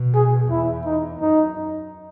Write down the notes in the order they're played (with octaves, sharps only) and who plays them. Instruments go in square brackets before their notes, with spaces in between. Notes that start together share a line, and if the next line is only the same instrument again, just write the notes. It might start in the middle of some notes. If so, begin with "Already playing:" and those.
Already playing: [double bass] B2
[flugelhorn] G#4
[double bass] E2 [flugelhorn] E4
[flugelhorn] D#4
[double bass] F#2 [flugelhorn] D#4